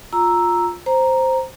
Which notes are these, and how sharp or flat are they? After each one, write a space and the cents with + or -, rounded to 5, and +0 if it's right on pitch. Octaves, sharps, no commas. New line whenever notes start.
F4 +10 A#5 +0 E6 +0
C5 +0 A#5 +0